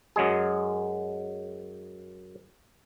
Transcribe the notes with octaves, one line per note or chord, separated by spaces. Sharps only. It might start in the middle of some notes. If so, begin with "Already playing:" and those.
F#2 F#3 G#3 G#4